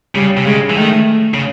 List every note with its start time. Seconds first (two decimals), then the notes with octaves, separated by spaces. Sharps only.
0.15 C#3 G3
0.37 C3
0.46 C#3 G#3
0.70 E3
0.77 D#3 A3
1.34 C#3